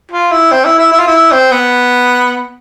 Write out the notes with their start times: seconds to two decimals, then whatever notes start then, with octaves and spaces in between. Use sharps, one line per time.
0.11 F4
0.32 E4
0.51 C4
0.65 E4
0.78 E4
0.92 E4
0.99 F4
1.07 E4
1.32 C4
1.52 B3